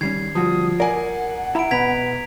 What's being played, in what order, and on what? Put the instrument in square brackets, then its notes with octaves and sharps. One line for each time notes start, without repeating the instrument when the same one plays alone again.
[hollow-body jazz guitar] D#3 G3 C#4 [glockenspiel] G#6 C7
[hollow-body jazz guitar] D2 G3 F#4 [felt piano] F3 [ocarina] D#6
[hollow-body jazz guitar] A#4 [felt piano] D5 G#5 [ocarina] F#5
[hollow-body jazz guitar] E4 E5 B5 [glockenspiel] A#5 D7
[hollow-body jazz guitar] B2 B5 [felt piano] B3 [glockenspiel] G#6 B6 F7